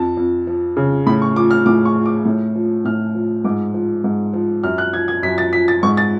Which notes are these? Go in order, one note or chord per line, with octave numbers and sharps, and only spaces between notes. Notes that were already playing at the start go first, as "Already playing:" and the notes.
Already playing: F2 A5
F2
F3
C#3
A2 B5
C#6
F3 D6
F6
A2 D6
C#6
F3
D6
A2
F3
A2 F6
F3
G#2 D6
F3
G#2
F3
F#2 F6
F#6
F3 G#6
G#6
F#2 B6
A6
F3 B6
A6
G#2 C#6
A6